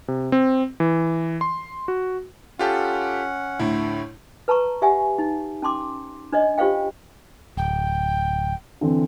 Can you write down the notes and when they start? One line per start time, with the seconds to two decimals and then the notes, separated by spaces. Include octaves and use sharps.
0.08 C3
0.32 C4
0.80 E3
1.41 C6
1.88 F#4
2.59 C#4 F4 G4 A4 F#5
3.59 D2 A2 E4
4.48 B4 A5 A#5 C#6
4.82 G4 E5 F#5 G#5
5.19 D#4
5.62 C#4 A5 C6 D6
6.32 D4 C#5 D#5
6.58 F4 G4 C5 C#5 F5 G5
7.57 D1 G5
8.81 D3 E3 C4